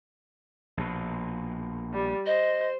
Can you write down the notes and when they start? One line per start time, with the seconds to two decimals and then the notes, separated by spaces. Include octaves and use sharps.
0.77 A#1 B2
1.94 G3
2.26 C5 D#5